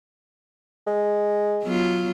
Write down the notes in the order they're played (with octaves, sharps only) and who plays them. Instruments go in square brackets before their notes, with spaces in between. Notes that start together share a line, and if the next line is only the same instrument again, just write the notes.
[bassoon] G#3
[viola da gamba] F#3 B3 F4